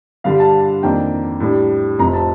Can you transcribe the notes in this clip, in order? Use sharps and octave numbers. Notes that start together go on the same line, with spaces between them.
G2 D3 G3 D4 F5
A5
F2 D#3 A#3 D4 G5
A2 G3 D4
F1 F2 C3 F3 A#5
A5